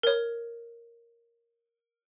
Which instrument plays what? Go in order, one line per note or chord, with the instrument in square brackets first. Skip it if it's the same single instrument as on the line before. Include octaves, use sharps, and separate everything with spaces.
[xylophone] A#4 C#5